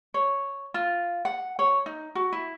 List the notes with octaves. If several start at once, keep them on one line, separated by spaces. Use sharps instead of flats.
C#5
F4
F#5
C#5
D#4
F#4
E4